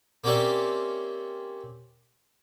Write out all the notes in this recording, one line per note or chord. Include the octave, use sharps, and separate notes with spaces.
A#3 C4 C#4 G4 D5 E5